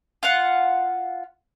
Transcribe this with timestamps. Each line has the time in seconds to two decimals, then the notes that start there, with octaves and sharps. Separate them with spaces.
0.23 F4 F5 F#5